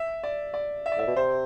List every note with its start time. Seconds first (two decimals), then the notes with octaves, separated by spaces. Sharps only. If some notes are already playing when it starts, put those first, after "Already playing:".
Already playing: E5
0.23 D5
0.54 D5
0.86 E5
0.92 D5
0.97 A2 E5
1.07 B2
1.16 C3 C5